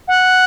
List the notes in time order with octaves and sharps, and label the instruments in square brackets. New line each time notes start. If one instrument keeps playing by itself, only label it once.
[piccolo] F#5